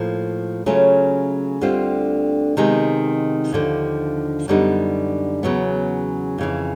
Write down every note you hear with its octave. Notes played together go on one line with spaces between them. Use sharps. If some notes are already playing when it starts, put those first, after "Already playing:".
Already playing: A2 F3 A#3
C#3 F#3 A3 C#4 F4
D2 D3 G3 C4 F4
C3 D#3 G#3 B3
D#2 D3 F3
F#2 D3 G3 B3 D#4
E2 C#3 F#3 B3
F2 C#3 E3